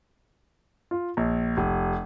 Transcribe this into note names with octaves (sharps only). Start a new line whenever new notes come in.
F4
A#1
F1